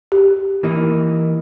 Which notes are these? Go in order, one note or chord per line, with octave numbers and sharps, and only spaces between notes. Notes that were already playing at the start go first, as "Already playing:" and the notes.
G4
E3 A#3 D#4